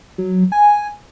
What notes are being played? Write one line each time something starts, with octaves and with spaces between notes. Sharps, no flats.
F#3
G#5